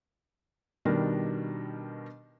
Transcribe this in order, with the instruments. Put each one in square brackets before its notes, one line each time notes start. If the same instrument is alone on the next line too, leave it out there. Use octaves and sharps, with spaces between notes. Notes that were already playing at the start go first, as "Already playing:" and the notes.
[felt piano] B2 D#3 G3 D4 A#4